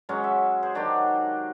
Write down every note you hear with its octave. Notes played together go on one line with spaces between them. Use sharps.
F#3 G#3 C#4
E5
G#4 C5
D#3 F#3 D4 G4